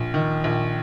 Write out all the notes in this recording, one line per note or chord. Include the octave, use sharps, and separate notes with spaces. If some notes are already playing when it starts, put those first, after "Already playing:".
Already playing: A#1
D#3
A#1